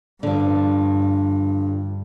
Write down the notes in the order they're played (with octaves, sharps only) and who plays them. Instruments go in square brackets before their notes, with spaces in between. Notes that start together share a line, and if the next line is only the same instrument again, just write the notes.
[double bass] G2 [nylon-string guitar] D3 F3